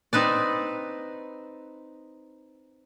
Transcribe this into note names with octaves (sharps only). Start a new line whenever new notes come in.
C4 D#4 B4 D5